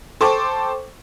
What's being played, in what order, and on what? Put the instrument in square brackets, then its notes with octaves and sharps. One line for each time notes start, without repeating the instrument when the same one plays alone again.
[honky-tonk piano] A4 C5 G5 C#6 D6